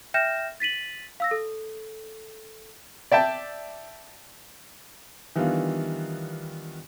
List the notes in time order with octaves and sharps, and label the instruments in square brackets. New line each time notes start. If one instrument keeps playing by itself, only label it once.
[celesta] E5 G5 F6 G6 A#6 E7
A6 B6 D#7 F#7
F5 E6 A#6
A4
[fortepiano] D5 E5 G5 A5
[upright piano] D#3 E3 G3 B3 D4 F4